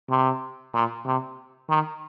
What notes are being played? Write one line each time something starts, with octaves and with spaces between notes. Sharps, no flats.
C3
A#2
C3
D#3